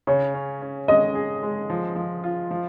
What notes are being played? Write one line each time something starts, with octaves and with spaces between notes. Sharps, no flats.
C#3 C#5
C#4
C#4
G#3 D#5
G#4
G#3
F3
F3
F4
F3